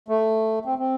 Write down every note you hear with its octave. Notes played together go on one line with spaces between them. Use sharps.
A3
C4
C4